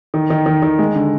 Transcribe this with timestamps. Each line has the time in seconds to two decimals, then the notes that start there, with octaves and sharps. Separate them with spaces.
0.14 D#3
0.30 D#3
0.46 D#3
0.62 D#3
0.79 G#3
0.95 D3